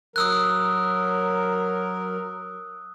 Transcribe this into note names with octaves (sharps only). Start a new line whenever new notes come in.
F#3 A#4 D#6 E6 F#6